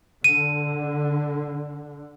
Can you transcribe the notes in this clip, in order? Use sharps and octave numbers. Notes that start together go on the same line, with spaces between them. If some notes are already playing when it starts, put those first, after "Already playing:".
D3 D#7